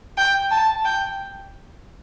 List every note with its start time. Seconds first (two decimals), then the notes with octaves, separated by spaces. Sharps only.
0.18 G5
0.51 A5
0.85 G5